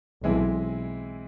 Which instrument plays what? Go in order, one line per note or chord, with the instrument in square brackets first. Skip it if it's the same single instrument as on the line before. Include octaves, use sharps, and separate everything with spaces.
[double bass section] B1 B2 [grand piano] E3 G#3 C4 E4